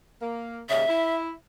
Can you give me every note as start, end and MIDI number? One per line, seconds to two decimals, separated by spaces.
0.21 0.61 58
0.69 0.83 39
0.69 0.83 44
0.69 0.83 49
0.69 1.16 76
0.88 1.30 64